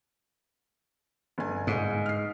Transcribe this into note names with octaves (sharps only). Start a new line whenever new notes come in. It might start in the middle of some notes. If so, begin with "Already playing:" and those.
G1 G#5
G#2
F6 C7